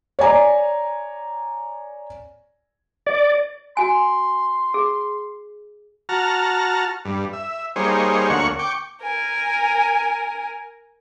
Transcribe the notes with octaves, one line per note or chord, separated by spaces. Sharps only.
C#5 D5 G#5 A#5
D5
F#4 G#5 C6
G#4
F#4 A5 A#5 F6
G2
E5
G3 A#3 D#4 G#4 C5 C#5
D2 A#3 C#5 F#5 C#6
G5 C#6 D6
A#4 G#5